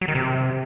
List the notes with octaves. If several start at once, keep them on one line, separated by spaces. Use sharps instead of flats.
F#3
D#3
C3